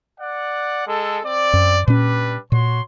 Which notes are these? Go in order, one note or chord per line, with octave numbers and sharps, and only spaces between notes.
D5 F#5
G#3 A4
C4 D5
F#2
A#2 G3 C#4 D4 B4
A#2 F#4 C#5 C6